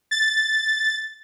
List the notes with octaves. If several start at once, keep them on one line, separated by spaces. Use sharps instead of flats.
A6